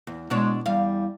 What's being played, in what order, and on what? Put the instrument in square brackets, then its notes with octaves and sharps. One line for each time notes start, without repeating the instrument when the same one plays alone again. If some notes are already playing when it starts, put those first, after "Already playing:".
[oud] E2
[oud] B2 D4 C#5 [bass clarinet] G#3
[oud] E2 F5 [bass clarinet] G3